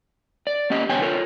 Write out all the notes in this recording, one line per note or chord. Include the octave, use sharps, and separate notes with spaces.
D5
A#3 C#4 G4 D#5
E2 B2 D3 C#5 G5 G#5
F4 A4 A#4 C#5